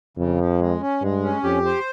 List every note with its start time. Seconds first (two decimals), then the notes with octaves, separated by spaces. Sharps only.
0.17 F2 C#3
0.38 F3
0.59 G#3
0.81 C#4
1.02 G2 G#3
1.23 C#4
1.43 F2 G4
1.65 C5